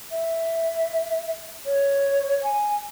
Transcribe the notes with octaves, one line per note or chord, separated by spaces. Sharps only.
E5
C#5
G#5